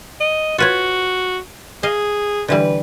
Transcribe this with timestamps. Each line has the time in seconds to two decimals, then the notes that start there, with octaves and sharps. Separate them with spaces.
0.20 D#5
0.58 F4 F#4 B4 C#5
1.83 G#4 D#5 F5
2.48 D3 E3 G3 B4